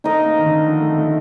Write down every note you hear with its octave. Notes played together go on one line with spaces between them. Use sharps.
A3 D#4 A#4 D#5
A#3
D#3
D3
F3
A3
A3